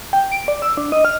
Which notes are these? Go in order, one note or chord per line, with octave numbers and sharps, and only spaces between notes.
G5
D7
D5
E6
D4
D#5
F6